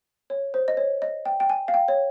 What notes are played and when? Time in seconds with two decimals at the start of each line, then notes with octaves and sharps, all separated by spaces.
0.30 C#5
0.54 C5
0.68 D#5
0.77 C#5
1.02 D#5
1.26 G5
1.40 G5
1.50 G#5
1.68 F5
1.74 G5
1.88 C#5